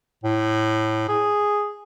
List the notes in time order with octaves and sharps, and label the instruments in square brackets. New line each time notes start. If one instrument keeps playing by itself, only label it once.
[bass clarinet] A2
G#4